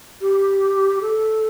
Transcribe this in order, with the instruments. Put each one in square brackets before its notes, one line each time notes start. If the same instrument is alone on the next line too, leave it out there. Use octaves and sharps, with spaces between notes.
[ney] G4
A4